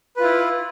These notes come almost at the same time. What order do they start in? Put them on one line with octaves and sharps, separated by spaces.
B4 F4 E4